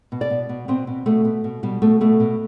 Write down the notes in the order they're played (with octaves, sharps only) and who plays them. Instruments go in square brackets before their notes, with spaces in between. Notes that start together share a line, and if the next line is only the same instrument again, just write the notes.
[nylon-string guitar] B2
D5
B2
B2
B2 C4
B2
B2 A3
B2
B2
B2 G3
B2 A3
B2 A3
B2